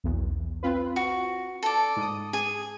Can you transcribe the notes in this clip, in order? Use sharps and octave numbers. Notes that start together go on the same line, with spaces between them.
B1 E2
C4 F4 B4
F#4
A4 D5
G#2 D#6
G#4